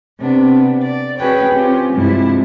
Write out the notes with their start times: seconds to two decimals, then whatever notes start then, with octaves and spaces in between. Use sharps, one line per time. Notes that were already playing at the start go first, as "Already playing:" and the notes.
0.18 C3 B3 D4
0.81 D5
1.18 C#4 F#4 G#4 B4 C#5 G5
1.52 C4 C#4 F4 G4
1.92 G2 C3 F3 G3 G#3 E4